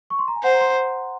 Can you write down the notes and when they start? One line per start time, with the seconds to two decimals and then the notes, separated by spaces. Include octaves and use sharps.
0.10 C#6
0.19 C6
0.28 A#5
0.36 G#5
0.44 C5 F#5
0.54 A#5
0.61 C6